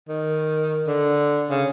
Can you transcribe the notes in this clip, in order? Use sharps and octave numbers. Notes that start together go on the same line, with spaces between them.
D#3
D3
C#3